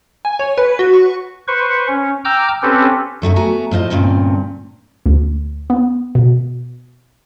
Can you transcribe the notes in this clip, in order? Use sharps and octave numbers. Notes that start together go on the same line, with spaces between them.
G#5
C#5
B4
F#4
C#6
B4 C5 C#6
C#4
G5 A#5 D6 E6 F6 G6
C4 C#4 G4 A4 B4
F#2 A3 D#4 F#4
B3 F#4 G#5 A#5
A2 F4 C5 D#5
D2 G2 A#2 C4 C#4
D2
B3
B2